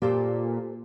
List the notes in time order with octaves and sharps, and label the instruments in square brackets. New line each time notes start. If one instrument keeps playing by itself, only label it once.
[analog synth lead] A#2 [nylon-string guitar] G4 A4 C5